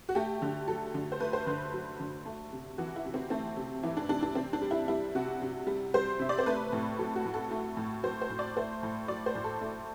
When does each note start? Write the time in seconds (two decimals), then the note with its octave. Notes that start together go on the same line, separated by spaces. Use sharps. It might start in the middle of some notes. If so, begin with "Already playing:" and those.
0.09 F#4
0.15 A3 G4
0.42 D3
0.68 F#3 A4
0.94 D3
1.12 C5
1.20 A3 B4
1.33 C5
1.47 D3 B4
1.73 F#3
2.00 D3
2.26 A3
2.52 C3
2.78 E3 F#4
2.96 E4
3.05 C3
3.14 C4
3.30 A3 C4
3.57 C3
3.83 E3 E4
3.97 D4
4.09 C3 D4
4.23 D4
4.35 C3 C4
4.53 D4
4.62 G3
4.71 E4
4.88 G3 E4
5.15 C3 F#4
5.42 C3
5.67 G3
5.94 G3 C5
6.19 C3 E5
6.29 D5
6.39 C5
6.46 A3 B4
6.73 A2
6.99 F#3 A4
7.16 F#4
7.25 A2
7.34 A4
7.51 A3
7.77 A2
8.03 F#3 C5
8.21 C5
8.30 A2
8.39 D5
8.57 A3 C5
8.83 A2
9.08 F#3 D5
9.26 C5
9.35 A2
9.44 A4
9.61 A3